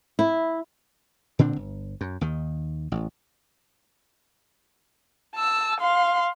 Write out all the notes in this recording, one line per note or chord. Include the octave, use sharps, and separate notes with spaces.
E4
A#2 D3 C4 D4
G1
F#2
D#2 D#3
A1
A5 E6
F5 C6